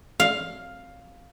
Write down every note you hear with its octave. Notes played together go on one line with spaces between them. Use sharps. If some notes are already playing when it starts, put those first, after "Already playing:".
F5